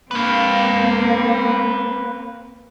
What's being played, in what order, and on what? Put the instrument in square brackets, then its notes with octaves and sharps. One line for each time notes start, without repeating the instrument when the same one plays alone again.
[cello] A#3 C4 [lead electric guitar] B4 F5